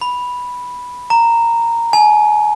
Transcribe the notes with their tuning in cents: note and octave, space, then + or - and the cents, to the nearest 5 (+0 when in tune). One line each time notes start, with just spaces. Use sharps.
B5 -5
A#5 -10
G#5 +35